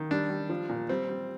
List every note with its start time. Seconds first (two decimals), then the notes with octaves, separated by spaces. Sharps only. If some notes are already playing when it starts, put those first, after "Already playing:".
Already playing: D#3
0.11 G3 D4
0.30 G3
0.50 F3
0.69 A#2
0.89 G3 C4
1.09 G3